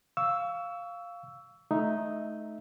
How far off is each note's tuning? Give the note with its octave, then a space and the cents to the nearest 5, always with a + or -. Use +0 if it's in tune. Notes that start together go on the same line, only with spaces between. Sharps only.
F5 +0 C#6 +30 E6 +0
A3 -25 D#4 +0 E5 +0